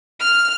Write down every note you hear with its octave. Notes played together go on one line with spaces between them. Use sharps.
F6